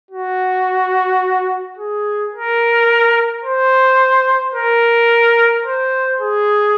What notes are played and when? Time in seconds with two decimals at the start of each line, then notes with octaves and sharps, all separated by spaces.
0.11 F#4
1.78 G#4
2.33 A#4
3.44 C5
4.55 A#4
5.65 C5
6.20 G#4